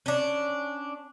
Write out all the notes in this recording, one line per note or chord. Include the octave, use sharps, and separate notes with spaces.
C#4 D4